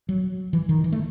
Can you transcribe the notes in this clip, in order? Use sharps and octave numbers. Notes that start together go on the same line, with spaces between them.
F#3
E3
D#3
E3
A3